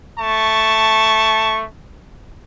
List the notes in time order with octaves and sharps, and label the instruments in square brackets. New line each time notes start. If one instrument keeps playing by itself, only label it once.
[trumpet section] A3 A5 C#6